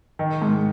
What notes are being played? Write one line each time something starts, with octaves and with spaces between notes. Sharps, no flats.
D#3
G#2